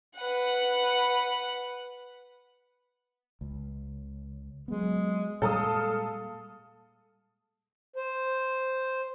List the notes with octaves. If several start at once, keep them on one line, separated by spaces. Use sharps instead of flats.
B4 F#5
C#2
F#3 G#3 B3
A#2 G3 G#3 A4 F5 A5 D#6
C5